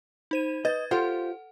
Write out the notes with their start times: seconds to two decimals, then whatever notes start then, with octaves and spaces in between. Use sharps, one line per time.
0.31 D#4 C5 D#7
0.65 B4 D#5 G#6 A6
0.91 F4 G4 A4 C5 F#5